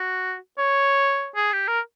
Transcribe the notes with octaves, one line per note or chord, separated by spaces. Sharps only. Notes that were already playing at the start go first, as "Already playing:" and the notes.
Already playing: F#4
C#5
G#4
G4
A#4